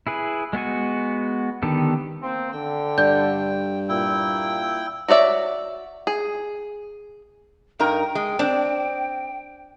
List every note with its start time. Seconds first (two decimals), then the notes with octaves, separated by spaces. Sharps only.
0.07 E4 G#4 B4
0.53 G#3 B3 F#4 G#5
1.62 D3 D#3 B3 G4 A4
2.21 A#3 C4 C5
2.52 D3 G5
2.98 G2 D5 G6
3.88 A#2 E4 G5
5.08 F#4 C#5 D5 E5
6.07 G#4
7.79 G2 D#4 A#4 G5
8.15 G#3
8.39 C4 D4